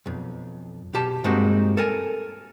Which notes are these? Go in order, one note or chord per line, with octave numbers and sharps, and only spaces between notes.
B1 F2
B2 G4 A5
G2 G#3 A#3 C4 D#4 F#4
A4 A#4 G#5